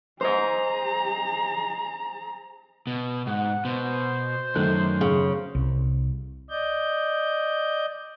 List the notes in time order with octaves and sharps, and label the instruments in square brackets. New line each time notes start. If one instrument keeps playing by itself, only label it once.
[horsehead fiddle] G#4 A#5 [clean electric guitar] C5 D#5
[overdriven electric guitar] B2
[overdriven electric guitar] G#2 [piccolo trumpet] F#5
[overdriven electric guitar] B2 [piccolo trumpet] C5
[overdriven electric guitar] F#2 [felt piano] D#3 A3 F#6
[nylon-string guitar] C#3
[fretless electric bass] C2
[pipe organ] D5 D#5 G6